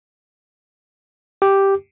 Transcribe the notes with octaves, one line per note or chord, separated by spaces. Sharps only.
G4